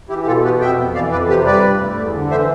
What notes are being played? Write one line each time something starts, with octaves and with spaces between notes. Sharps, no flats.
E3 E4 G4
G4
B2 F4 A4
B3 G4 B4
F2 E5 G5
F2
E3 D5 F5
F2 B4 D5
C3 G4 B4
G3 B4 D5
G2
A3
E2
D3
E3 C5 E5